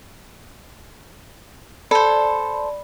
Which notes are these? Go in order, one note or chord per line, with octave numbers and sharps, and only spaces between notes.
A4 C5 D5 B5